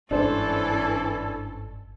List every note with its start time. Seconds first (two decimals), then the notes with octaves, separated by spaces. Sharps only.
0.11 G1 G#2 E3 C#4 D4 A4 C5